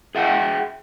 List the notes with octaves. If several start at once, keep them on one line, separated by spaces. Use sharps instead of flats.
G#4 E5 F#5 G5